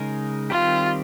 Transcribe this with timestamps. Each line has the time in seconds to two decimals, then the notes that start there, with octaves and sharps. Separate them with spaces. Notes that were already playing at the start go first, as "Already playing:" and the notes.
Already playing: C#3 G#3 D#4 A#4
0.50 D#3 G3 C4 F4 G4